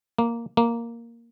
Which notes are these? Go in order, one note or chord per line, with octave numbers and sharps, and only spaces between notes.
A#3
A#3